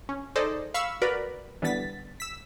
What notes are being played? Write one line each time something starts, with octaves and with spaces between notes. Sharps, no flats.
C#4
D#4 G#4 A4 C5 D5 D#5
F5 B5 C#6 E6
F#4 A#4 B4 D5 B5
D3 E3 G3 B3 A6 B6
E6 B6